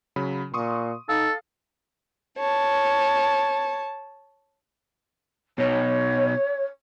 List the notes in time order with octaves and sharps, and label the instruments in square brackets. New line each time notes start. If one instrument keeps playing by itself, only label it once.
[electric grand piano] C#3 F#3 B5
[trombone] A#2 [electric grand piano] C6 C#6 D#6
[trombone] D#4 [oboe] A4 [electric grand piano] F5
[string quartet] C#5 A5
[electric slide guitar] B2 D#4 [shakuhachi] C#5